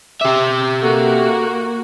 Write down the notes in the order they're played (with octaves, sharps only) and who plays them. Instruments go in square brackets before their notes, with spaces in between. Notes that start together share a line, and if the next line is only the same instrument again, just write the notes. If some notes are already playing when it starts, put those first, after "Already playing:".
[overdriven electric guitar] G4 E5 [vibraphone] D6
[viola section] A#3 F#4 [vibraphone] A4